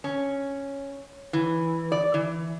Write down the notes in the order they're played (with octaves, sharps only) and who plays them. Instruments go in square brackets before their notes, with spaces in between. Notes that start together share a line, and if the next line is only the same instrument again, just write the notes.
[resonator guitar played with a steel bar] C#4
E3
D5
E3